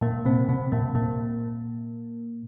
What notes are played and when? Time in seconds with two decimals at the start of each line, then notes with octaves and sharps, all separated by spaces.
0.01 A#2 A#3
0.25 C3 C4
0.49 C3 C4
0.72 A#2 A#3
0.95 A#2 A#3